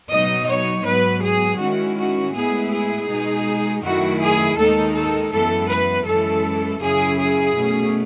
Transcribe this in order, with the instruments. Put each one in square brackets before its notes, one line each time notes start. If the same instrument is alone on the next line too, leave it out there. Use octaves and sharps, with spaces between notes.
[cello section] B2 F#3 B3 D#4 D#5
C#5
G#2 F#3 B3 B4
G#4
D#3 G#3 C#4 E4 F#4
F#4
A2 G#3 B3 E4 G#4
G#4
B2 G#3 D#4
F#2 D#3 A3 E4 F#4
G#4
D#2 D#3 G#3 D#4 A4
A4
F#2 E3 G#3 B3 A4
B4
F#2 E3 G#3 C#4 E4 A4
F#2 C#3 F#3 C#4 E4 G#4
G#4
B2 A3 C#4